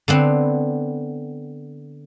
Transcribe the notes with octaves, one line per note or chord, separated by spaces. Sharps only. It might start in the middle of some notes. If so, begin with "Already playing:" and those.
D3 B3 C4